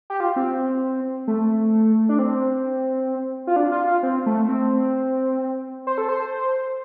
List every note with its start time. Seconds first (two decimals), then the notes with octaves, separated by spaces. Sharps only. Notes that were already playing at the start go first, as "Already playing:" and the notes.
0.10 G4
0.20 F4
0.36 C4
1.28 A3
2.09 D4
2.19 C4
3.47 F4
3.56 D4
3.72 F4
3.87 F4
4.03 C4
4.26 A3
4.48 C4
5.87 C5
5.98 A4
6.09 C5